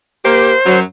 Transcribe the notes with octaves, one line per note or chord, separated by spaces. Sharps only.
A#3 G4 C5
F#2 F#3